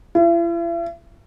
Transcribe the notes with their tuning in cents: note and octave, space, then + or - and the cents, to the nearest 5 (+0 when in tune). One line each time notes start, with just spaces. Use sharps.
E4 +45